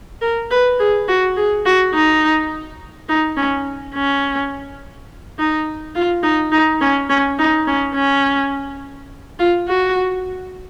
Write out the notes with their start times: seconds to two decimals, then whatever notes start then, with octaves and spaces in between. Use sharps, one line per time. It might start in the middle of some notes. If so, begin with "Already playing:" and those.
0.22 A#4
0.51 B4
0.79 G#4
1.08 F#4
1.37 G#4
1.65 F#4
1.94 D#4
3.09 D#4
3.37 C#4
3.95 C#4
5.38 D#4
5.95 F4
6.23 D#4
6.52 D#4
6.81 C#4
7.09 C#4
7.38 D#4
7.67 C#4
7.95 C#4
9.39 F4
9.68 F#4